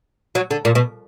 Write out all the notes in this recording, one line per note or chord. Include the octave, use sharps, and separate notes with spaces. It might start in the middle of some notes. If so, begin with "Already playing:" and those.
F#3
D3
A#2
B2